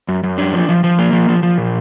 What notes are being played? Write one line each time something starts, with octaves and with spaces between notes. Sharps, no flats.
F#2
F#2
D4
F3
F3
F3
A#3
F3
F3
F3
A#2